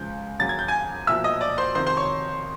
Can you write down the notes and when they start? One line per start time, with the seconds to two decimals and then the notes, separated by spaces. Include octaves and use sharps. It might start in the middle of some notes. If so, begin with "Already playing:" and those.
Already playing: C#2 C#3 F3 G6
0.39 D#2 C#3 F#3 A6
0.49 G#6
0.59 G6
0.68 G#5 G#6
1.07 B1 A#2 F3 E5 E6
1.24 D#5 D#6
1.41 D5 D6
1.58 C5 C6
1.75 F2 C3 D#3 C5 C6
1.86 C5 C6
1.97 C#5 C#6